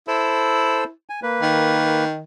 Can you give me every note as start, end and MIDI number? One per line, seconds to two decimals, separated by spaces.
0.08 0.90 64
0.08 0.84 69
0.08 0.84 72
0.08 0.84 88
1.10 1.20 80
1.23 2.05 58
1.23 2.05 71
1.42 2.22 51